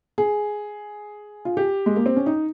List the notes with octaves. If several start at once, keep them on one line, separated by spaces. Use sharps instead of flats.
G#4
F4
G4
G#3
A#3
C4
C#4
D#4